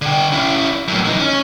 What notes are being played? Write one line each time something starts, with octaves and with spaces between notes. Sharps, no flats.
D3 G5
C#4 E4
F#2 A2
E3 D#4
C#4